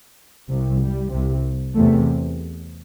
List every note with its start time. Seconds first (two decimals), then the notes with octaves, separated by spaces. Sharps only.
0.49 C2 C3
0.82 G3
1.13 C2 C3
1.76 E2 C3 A3